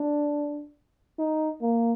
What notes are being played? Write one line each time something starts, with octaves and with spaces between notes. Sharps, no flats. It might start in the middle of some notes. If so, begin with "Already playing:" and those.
Already playing: D4
D#4
A#3